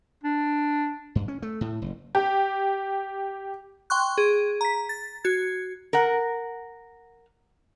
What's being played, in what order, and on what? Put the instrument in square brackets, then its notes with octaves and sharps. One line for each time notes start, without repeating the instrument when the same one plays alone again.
[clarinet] D4
[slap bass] G2
C#4
A3
A2
F#1
[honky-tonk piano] G4
[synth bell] G5 C6 C#6 F#6
G#4
A#5 B6
A6
F#4 G#6
[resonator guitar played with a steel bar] A#4 F#5